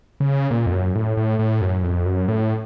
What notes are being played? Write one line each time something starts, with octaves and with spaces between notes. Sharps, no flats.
C#3
A#2
F2
F#2
A2
A2
A2
F#2
F2
F#2
A2